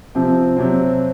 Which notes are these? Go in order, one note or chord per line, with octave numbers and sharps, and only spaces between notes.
C3 F3 C4
C3 F#3 C4